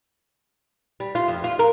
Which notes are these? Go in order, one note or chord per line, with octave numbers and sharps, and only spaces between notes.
G3
F4
F2
F4
A#4